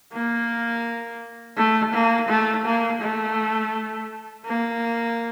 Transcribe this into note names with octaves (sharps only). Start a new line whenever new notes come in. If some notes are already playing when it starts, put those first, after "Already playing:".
A#3
A3
A#3
A3
A#3
A3
A#3